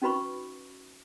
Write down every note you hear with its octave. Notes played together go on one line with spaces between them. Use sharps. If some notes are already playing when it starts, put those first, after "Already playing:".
C#4 D#4 F#4 B4 B5 C#6